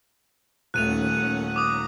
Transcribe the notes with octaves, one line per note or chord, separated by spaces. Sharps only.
D#1 D#2 A3 C#4 F#5 F#6 D#7 F7
A#5 D6 D#6